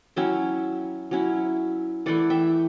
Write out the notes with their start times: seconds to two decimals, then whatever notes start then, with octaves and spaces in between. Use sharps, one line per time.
0.16 F#3 C#4 E4 E5 G5
1.11 F#3 C#4 E4
2.06 E3 A3 E4 D5 F#5
2.30 E5 G5